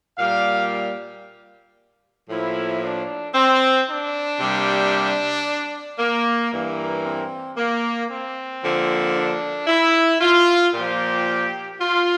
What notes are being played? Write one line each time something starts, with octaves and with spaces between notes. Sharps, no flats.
A#2 G3 A#3 F5
A2 F3 A#3 E4
D4
C4
D4
C3 G3 A#3
A#3
G2 E3 A#3
C4
A#3
C4
D3 F3 A#3
D4
E4
F4
A#2 F3 A#3 G4
F4